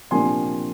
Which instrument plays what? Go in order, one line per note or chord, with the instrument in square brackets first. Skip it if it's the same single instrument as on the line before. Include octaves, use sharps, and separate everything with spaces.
[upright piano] C3 F3 A#3 D4 G#5 C6